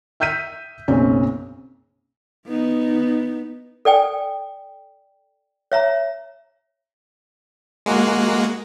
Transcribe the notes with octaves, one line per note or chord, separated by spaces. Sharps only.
E5 E6 G6 B6 D#7
F#1 B1 C4 C#4
B3 D#4
A4 D5 G5 G#5
C#5 E5 A#5
G#3 A#3 F#4